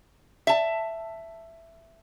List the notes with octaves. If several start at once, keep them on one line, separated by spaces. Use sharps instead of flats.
E5 A5